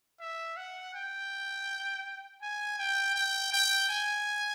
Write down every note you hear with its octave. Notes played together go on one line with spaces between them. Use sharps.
E5
F#5
G5
G#5
G5
G5
G5
G#5